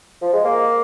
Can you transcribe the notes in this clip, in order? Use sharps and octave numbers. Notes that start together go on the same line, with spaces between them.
F3
G#3
A#3